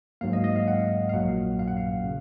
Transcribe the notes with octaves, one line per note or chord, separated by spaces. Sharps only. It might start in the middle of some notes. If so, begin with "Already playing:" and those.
G#2 F#3 A#3 F5
D#5
D#5
F5
F#5
F5
A#1 A#2 F#3 A#3 F#5
F5
F#5
F5
C#3